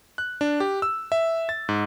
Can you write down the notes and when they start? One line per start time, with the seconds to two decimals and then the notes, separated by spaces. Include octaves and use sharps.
0.18 F#6
0.41 D4
0.60 G4
0.82 E6
1.12 E5
1.49 A6
1.69 G#2